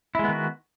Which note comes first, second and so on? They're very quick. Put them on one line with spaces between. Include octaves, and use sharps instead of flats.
E4 G#3 B3 D#3 F#4